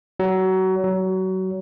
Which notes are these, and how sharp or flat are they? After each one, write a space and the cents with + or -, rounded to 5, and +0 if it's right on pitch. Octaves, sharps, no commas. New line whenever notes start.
F#3 +25
F#3 +25